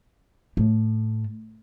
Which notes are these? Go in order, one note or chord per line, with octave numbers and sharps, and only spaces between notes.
A2